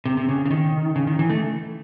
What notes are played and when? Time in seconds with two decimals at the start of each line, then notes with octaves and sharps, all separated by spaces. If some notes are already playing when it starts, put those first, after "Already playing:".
0.05 C3
0.17 C3
0.29 C#3
0.46 C#3
0.51 D#3
0.96 C#3
1.07 D#3
1.19 E3
1.29 A3